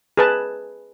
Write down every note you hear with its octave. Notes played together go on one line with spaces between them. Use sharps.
G#4 B4 A5